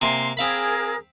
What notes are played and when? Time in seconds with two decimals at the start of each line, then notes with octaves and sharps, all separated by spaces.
0.02 C3 A#3 G#5 C6
0.37 C4 G#4 A#4 F5 B5